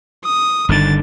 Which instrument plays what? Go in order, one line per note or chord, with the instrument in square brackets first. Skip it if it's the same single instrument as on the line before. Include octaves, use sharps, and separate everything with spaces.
[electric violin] D#6
[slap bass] G1 D3 D#3 [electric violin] D4 A6